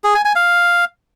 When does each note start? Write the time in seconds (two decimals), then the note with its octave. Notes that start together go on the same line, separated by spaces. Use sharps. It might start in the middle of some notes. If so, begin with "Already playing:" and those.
0.04 G#4
0.14 G#5
0.25 G#5
0.35 F5